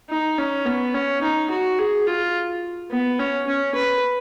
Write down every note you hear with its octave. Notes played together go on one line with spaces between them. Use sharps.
D#4
C#4
B3
C#4
D#4
F#4
G#4
F4
B3
C#4
C#4
B4